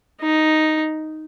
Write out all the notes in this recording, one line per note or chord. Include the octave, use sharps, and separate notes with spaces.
D#4